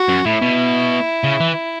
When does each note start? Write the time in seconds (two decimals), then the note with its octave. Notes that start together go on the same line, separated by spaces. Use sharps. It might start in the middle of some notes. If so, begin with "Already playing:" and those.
Already playing: F#4
0.09 F#2
0.25 A2 E4
0.42 B2
1.24 C#3
1.40 E3